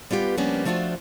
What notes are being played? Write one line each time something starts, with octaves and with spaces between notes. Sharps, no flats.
G3 B3 F4 G4 B4
F3 G3 A#3 B3 C#4 D4
F3 A3 D4 F4 F#4 C5